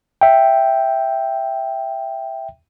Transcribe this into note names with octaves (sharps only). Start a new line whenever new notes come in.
E5 G5